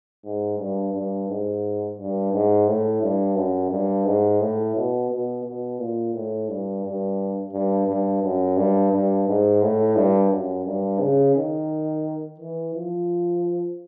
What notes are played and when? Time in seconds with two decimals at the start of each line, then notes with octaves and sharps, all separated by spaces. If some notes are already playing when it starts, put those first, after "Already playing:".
0.25 G#2
0.58 G2
0.94 G2
1.29 G#2
1.98 G2
2.33 G#2
2.67 A2
3.02 G2
3.36 F#2
3.71 G2
4.06 G#2
4.40 A2
4.75 B2
5.10 B2
5.45 B2
5.79 A#2
6.14 A2
6.49 G2
6.84 G2
7.53 G2
7.87 G2
8.23 F#2
8.57 G2
8.92 G2
9.28 G#2
9.62 A2
9.96 G2
10.31 F#2
10.66 G2
11.00 C#3
11.35 D#3
12.40 E3
12.75 F3